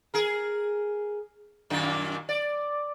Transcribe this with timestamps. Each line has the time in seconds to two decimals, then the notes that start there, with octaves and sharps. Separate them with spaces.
0.14 G#4 A#4
1.70 F#2 A#2 D#3
2.29 D5